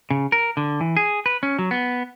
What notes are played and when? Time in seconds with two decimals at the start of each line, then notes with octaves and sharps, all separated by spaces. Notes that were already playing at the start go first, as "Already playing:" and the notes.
0.11 C#3
0.32 A#4
0.57 D3
0.81 E3
0.97 G#4
1.26 B4
1.43 C#4
1.59 F#3
1.71 B3